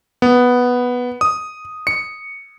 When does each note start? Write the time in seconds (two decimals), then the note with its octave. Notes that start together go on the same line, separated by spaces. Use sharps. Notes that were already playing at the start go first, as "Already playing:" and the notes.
0.22 B3
1.21 D#6
1.87 C#7